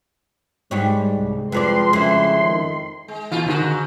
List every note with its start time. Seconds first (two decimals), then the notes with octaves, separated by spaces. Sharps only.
0.71 G#2 G3 G#3 C#5
1.16 C2
1.52 F2 F3 B4 D5 C6
1.93 F2 C#3 E4
2.43 D#3
3.08 G#3
3.32 A#2 E3 F4
3.46 G#2 D3 D#3 E4 F#4